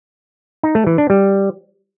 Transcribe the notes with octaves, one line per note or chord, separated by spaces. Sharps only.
D#4
A3
E3
D4
G3